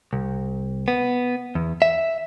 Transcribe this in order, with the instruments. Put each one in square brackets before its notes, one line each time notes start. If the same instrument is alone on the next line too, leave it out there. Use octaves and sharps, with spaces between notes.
[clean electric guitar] C2
B3
E2
E5